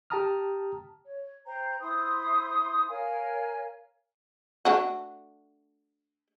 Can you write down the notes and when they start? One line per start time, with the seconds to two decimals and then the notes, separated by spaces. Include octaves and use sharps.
0.10 G4 G5 A5 A#5 D#6 F6
1.05 C#5
1.45 C5 G5 A#5
1.80 E4 C5 C6 D#6
2.88 A#4 C#5 F5 G#5
4.65 A3 D4 F#4